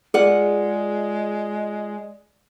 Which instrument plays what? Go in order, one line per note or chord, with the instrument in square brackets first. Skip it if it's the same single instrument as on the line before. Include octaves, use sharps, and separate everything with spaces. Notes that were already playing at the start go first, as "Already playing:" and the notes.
[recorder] G#3 [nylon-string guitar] F4 F#5 [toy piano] G#4 [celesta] D5